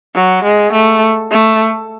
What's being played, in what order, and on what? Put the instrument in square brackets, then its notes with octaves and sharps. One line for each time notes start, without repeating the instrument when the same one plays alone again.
[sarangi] F#3
G#3
A3
A3